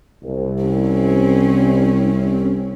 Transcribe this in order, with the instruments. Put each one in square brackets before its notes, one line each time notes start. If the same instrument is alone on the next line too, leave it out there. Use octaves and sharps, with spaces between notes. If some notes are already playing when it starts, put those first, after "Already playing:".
[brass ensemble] C2
[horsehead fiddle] C4 C#4